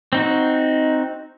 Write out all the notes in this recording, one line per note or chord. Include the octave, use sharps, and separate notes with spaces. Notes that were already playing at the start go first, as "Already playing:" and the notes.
C4 D#4 F#4